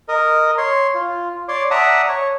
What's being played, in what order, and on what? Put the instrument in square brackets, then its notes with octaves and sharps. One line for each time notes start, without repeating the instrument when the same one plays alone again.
[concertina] A#4 D#5
C#5 C6
F4
C#5 D5 C6 D6
D5 E5 F#5 A5 A#5 D#6
C#5